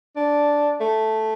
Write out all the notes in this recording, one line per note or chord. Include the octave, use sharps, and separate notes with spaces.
D4
A3